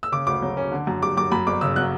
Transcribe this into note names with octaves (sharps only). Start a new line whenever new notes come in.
E6
C#3 D6
D2 D6
F#3
C#4
D3
F#2
G3 D6
F#2 D6
F#2 B5
G1 D6
C#3 E6
F#3 F#6